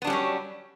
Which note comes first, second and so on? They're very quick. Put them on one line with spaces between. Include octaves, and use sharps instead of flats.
B3 D4 G3 C#4 F#3